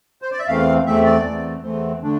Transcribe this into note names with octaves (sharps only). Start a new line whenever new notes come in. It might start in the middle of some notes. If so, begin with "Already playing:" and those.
C5
D5
E5
E2 E3 A3 C4 F5
E2 E3 A3 C4 E5
D5
E2 E3 A3 C4
E2 E3 A3 C4
D3 A3 D4